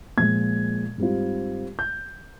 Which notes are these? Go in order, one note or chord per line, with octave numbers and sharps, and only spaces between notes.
A#2 F3 G#3 G#6
G#2 G3 C4 F4
G6